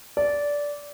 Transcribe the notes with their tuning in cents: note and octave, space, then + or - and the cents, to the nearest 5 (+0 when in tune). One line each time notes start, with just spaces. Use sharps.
D5 -15